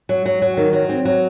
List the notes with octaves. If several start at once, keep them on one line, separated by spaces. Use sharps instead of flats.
F#3
F#3
F#3
D#3
F#3
C4
F#3